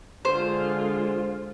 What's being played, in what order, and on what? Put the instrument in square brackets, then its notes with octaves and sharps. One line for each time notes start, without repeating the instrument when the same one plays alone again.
[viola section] D3 G#3 F4 [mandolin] C5